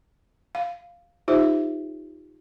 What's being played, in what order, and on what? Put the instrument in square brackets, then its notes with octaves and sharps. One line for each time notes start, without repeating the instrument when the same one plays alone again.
[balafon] F5
D#4 F4 G4 C5 E5